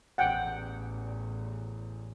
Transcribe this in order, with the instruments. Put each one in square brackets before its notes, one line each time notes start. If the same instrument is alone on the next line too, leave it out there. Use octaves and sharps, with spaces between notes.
[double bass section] A1 E2 [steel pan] F#5 G5